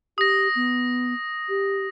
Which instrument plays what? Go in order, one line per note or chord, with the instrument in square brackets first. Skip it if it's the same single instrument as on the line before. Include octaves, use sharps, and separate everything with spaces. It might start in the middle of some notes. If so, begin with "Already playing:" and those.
[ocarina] G4 [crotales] D#6 A#6
[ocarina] B3
G4